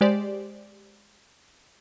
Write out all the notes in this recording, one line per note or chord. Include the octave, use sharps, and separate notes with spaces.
G#3 G4 C5 D5